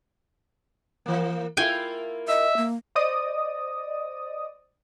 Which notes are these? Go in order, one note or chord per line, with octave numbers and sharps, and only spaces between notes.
E3 A#3
A#3 E4 F4 G5 G#5
D#5 E5
A#3
C5 D5 D#5 D#6